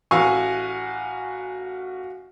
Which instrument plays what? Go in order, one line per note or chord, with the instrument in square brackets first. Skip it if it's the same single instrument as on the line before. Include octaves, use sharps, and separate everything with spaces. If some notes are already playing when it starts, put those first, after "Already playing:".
[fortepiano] A1 C#6 E6 [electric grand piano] F#4 F5 G#5